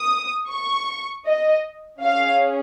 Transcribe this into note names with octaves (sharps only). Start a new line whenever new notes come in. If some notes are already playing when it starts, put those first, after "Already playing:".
Already playing: D#6
C#6
D#5
C#4 G#4 F5